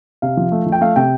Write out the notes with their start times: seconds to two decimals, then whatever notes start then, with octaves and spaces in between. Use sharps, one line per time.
0.22 C3 F5
0.37 F3
0.52 A3
0.66 F3
0.72 G5
0.81 A3 F5
0.96 C3 G5